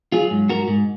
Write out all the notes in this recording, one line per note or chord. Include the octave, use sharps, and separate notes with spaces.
F#3 F4 G#4
G#2
G#2 F#4 A#4
G#2